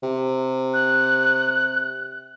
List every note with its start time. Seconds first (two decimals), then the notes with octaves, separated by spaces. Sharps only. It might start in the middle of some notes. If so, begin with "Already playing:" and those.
0.03 C3
0.74 F#6